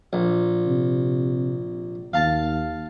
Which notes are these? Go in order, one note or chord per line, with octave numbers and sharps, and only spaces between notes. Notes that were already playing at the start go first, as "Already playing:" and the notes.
A#1
C3
D#2 F5 A5